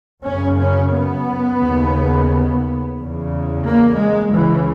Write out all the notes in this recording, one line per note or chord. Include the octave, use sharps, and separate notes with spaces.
F#2 C#3 C#4
C#4
B3
D#2 C#3
E2 C#3
A#3
G#3
C#2 C#3 E3